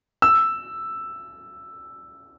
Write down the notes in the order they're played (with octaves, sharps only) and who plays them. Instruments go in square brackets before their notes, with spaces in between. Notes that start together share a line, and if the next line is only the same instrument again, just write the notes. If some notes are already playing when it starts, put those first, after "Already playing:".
[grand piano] E6